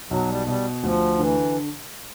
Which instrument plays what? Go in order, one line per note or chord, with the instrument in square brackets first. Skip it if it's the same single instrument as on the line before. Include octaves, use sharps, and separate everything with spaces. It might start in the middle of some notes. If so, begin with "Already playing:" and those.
[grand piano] B1 [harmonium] F#3
[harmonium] G3
[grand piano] B2 [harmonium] G3
[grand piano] D2 [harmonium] F3
[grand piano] D3 [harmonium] E3